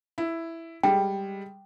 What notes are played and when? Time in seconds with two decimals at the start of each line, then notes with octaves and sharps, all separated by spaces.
0.18 E4
0.83 G3 G#3 G5